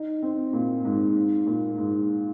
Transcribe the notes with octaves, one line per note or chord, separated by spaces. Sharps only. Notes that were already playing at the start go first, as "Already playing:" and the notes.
Already playing: D#4
C4
A#2
G#2
G#2
A#2
G#2